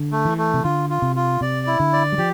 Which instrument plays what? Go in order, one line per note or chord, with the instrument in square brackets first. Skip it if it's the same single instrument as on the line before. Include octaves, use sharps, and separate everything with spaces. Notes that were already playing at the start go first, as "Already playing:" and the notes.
Already playing: [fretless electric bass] D3
[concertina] A3
[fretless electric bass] E3
[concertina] A3
[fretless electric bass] C3
[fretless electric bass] D3 [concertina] F4
[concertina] F4
[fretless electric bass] C3
[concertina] F4
[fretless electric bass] C3 [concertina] D5
[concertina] E4
[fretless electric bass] D3
[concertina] D5
[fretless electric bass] G3
[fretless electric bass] F3 [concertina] G4